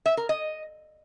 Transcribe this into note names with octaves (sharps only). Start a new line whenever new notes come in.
E5
A#4
D#5